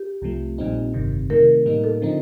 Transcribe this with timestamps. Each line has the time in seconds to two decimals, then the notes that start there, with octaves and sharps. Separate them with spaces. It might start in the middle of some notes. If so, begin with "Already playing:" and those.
Already playing: G4
0.22 C2 C3 F3 A3
0.58 A#1 A#2 G3 C4 D#4
0.94 G1 F2 C3 D#3
1.30 C3 D#3 A3 A#4
1.66 A2 G3 A#3 D#4
1.84 A4
2.02 D3 F3 C4 D#4